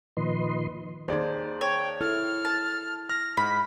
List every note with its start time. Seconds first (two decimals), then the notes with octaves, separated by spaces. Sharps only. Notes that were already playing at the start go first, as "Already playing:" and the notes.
0.17 A#2 D#3 F3 B4 D#5 C6
1.08 D#2 D#4 G#4 C5 D5 G#6
1.61 C#5 G5
2.01 E4 A4 F6
2.45 A5
3.09 F6 A#6
3.37 G#2 B5 B6